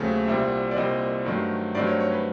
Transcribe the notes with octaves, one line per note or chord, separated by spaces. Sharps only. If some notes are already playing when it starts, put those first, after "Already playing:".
Already playing: D#2 C#3 F#3 A3 C4
C2 A#2 G3 C4 E5
D5
C2 A#2 G3 C4 D#5
G2 D#3 F#3 A3 C4
G2 D#3 F#3 A3 C4 D5
C#5
C#5
B4